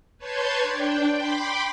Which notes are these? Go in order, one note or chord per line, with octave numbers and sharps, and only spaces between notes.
B4 C#5 A5 C6 G6 G#6
D4 G5
G5 B5 C6 D6